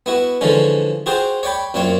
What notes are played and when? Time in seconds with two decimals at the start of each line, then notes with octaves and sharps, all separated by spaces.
0.06 B3 E4 F#4
0.41 D3 E3 F3 G#3 C#4
1.06 F4 F#4 G#4 C5 G5
1.43 C#5 D5 G5 B5
1.74 F#2 A#2 C4 F4 C#5